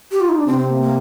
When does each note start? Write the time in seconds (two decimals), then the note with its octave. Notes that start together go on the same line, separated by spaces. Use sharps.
0.11 G4
0.21 F4
0.29 D#4
0.38 D4
0.46 C3 C4
0.58 C4
0.70 A#3
0.82 A#3